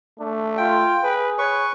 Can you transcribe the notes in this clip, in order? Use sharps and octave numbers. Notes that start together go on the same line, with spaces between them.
A3 D4
F4 G5
G#4 B4
B4 C#5 C#6